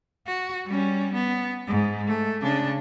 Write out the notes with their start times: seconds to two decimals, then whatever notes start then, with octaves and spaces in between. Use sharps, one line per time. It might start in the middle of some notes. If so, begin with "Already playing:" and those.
0.27 F#4
0.66 G3 C#4
1.14 B3
1.68 G#2
2.07 A3
2.41 C#3 D4